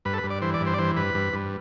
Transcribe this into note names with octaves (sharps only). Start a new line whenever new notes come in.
G2 B4
A4
B4
G2
D5
E3 C5
D5
G2
C5
D5
E3 C5
G2 B4
G2
G2